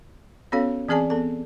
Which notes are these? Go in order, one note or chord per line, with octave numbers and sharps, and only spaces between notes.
B3 C#4 F#4 A4 C#5 F5
E3 C4 G#4 D5 G#5 A5
B3 A4